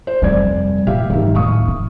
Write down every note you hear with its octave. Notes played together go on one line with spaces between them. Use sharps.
C5
F1 G2 G3 D5 G#6
A#2 G4 E5 F5
G#2 D#3 E5
D#2 A2 F5 C#6 D#6
E4